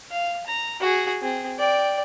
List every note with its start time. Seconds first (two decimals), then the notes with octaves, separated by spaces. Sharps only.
0.11 F5
0.46 A#5
0.80 F#4 G#4
1.21 C4 G#4
1.58 D5 G5